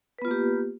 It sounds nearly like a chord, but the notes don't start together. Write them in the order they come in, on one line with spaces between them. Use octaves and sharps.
B4 B3 F4 A#3 G4